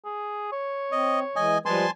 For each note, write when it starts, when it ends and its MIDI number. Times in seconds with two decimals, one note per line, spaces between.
0.05 0.48 68
0.52 1.50 73
0.92 1.23 60
0.92 1.20 75
1.36 1.57 52
1.36 1.57 56
1.36 1.58 75
1.36 1.58 80
1.66 1.86 53
1.66 1.86 55
1.66 1.83 56
1.66 1.86 71
1.66 1.91 80
1.66 1.91 81
1.66 1.91 84